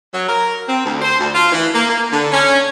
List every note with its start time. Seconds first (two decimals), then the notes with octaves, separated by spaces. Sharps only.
0.12 F#3
0.28 A#4
0.67 C4
0.85 D2
1.02 C5
1.19 D2
1.34 F4
1.51 E3
1.74 A#3
1.89 A#3
2.11 D3
2.32 C#4